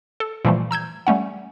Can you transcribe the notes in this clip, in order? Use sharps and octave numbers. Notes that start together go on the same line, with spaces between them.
A4
A#2 E3 F3 G3 A3
A#5 E6 G6 G#6
G3 A3 C#4 F#5